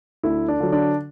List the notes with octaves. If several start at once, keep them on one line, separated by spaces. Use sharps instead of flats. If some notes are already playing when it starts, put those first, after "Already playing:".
D2 E4
D4
D3 F#3
D4